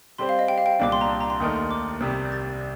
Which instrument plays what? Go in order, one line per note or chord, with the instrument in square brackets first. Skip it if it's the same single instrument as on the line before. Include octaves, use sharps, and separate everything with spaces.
[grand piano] G3 C4 G4 C5 [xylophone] C6
[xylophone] F5
D#5
G5
F5
G5
[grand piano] C2 A#2 G3 D4 [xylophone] D6
[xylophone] C6
A#5
A5
A#5
C6
[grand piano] D#2 D#3 A3 D#4 A#4 [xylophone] D#6
[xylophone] C6
D6
[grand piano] C2 C3 G3 [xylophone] D#6
[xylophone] G6
A6